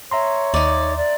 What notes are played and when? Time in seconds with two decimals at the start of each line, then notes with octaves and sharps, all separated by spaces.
0.11 C#5 E5 A#5 C6
0.54 D#2 D#4 D5
0.96 D5